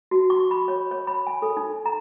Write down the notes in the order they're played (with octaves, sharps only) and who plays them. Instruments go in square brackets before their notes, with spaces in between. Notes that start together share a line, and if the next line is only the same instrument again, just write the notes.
[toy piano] F#4
C#6
B5
C#5
C#5
B5
G#5
A4
D#4
A#5